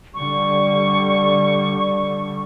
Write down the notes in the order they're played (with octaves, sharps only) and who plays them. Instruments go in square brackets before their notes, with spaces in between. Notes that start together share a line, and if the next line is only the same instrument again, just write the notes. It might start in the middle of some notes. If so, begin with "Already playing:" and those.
[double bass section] D3 G3 [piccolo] C#6